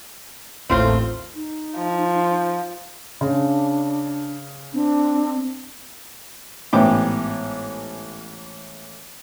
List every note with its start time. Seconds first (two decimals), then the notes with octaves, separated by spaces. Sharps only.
0.69 A1 D#2 A2 C4 F4 C5
1.35 D#4
1.76 F3
3.21 C#3 D4
4.73 C4 D4
6.73 A1 G#2 B3 G5 D6